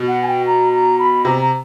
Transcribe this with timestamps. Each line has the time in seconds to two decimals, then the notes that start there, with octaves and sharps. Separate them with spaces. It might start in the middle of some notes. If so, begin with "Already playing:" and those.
Already playing: B2
0.08 F#5
0.23 G#5
0.28 G5
0.47 A#5
0.73 A#5
0.99 B5
1.25 C3 A#5
1.42 A#5